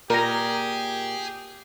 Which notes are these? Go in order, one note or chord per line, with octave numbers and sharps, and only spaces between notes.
A#2 G4 G#4 A#4 A#5